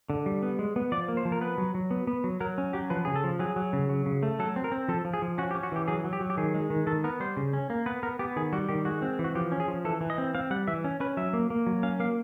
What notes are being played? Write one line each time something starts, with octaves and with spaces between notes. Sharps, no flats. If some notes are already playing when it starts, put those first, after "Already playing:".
D3
G3
B3
G#3
B3
F3 D5
A#3
C5
F3
A#4
B3 B4
F#3
F#3
B3
B3
F#3
F#3 A#4
C#4
F#3 G4
F3 B4
C#3 G#4
A4
F3
F#3 G#4
F#3
C#3
F#3
C#3
A3
F#3 A4
C4
A#4
C4
F3 A4
F3
G#4
F3
C#4 F#4
G4
C#4
F#4
E3 G4
F#3 G#4
F#3
G4
F#3
G4
D#3 G#4
G#3
D#3
D#3 A4
B3 A#4
G3 C5
C#3
C#4
A#3
B3 B4
B3 A#4
B3 G4
D#3 G#4
G3 F#4
D#3 G4
G#3 F#4
C4
E3
F#4
F3 G4
C#4
G#4
F3
E3 A4
E3
D#5
C4
C4 F5
G3 F#5
E3 E5
C#4
C#4 B4
F#3 E5
A#3
A#3
F#3
C#4 F5
A#3 F5